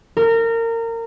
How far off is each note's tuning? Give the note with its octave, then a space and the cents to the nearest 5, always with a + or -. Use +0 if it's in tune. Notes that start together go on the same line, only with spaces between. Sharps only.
A#4 -25